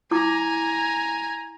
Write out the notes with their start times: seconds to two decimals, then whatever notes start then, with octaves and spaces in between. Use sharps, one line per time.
0.11 E4 G#5 A#5 D6